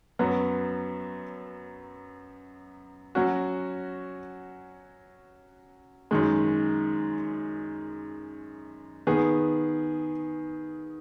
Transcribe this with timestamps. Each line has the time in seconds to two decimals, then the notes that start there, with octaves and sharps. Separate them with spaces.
0.19 F#2 F#3 B3
3.15 F#3 C#4 F#4
6.11 F#2 D#3 G#3
9.07 D#3 B3 G#4